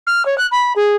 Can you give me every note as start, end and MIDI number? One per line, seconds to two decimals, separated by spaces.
0.07 0.25 89
0.26 0.38 73
0.38 0.47 90
0.51 0.73 83
0.76 0.96 68